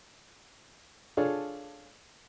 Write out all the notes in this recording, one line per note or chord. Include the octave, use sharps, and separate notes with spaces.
D4 F4 G#4 A4 C#5